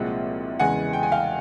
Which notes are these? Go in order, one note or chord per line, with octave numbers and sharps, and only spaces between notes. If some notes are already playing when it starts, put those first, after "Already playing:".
Already playing: C2 A#2 F3 G#3 C4 F#5
E2 C#3 E3 G#3 F#5 G#5
G5
G#5
F5 G5